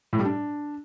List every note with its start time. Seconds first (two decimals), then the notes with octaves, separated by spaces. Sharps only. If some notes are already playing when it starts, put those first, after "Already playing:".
0.13 A2
0.19 G3
0.25 D4